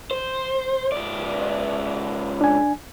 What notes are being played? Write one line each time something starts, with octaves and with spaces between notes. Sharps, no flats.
C5
C#2 D5
D4 G#5